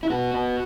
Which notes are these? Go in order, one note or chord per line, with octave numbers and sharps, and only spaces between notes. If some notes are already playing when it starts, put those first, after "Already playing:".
E4
B3 F#4
B3